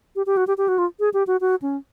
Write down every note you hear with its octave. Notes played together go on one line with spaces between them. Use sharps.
G4
G4
F#4
G4
G4
F#4
F4
G#4
G4
F#4
F#4
C#4